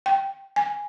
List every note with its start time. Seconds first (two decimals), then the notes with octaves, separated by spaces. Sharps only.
0.06 G5
0.56 G#5